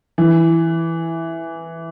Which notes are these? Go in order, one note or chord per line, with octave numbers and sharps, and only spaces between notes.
E3